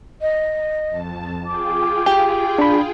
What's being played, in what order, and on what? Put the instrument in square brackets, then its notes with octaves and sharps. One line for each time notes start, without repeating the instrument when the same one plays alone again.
[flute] D#5
[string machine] F2 A5
[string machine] F4 G#4 G5 [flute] D6
[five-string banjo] G4
[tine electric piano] D4 B5